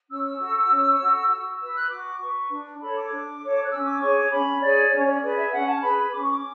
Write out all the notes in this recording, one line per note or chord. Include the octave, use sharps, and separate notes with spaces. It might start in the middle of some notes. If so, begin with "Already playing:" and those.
C#4 E6
F#4 A4
C#4
F#4 A4
F#4 E6
B4 E6
F#6
F#4 D6
B4 C#6
D4
A4 C#5 B5
D6
D4
A4 C#5
F#6
C#4 E6
D6
G#4 C#5 C#6
D6
C#4 B5
G#4 C#5 D5
C#4 C#5
D5
G#4 B4 D5
E5
C#4 F#5
A5
G#4 B4 B5
B5
C#4 D6
C#6
D6